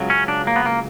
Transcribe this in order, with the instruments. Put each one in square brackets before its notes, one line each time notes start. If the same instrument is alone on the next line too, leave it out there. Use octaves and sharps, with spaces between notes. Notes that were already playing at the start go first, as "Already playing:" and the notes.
Already playing: [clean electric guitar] C#2 C#3 F#3
C#4
D4
A#3
B3
A#3